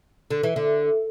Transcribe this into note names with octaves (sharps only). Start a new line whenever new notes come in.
D3
E3
D3